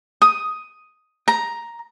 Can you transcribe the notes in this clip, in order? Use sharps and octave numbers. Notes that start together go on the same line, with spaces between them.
D#6
A#5